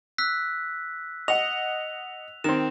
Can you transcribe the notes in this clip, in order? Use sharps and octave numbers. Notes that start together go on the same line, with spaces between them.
E6 F#6 B6
D#5 F#5 F7
D#3 C4 E7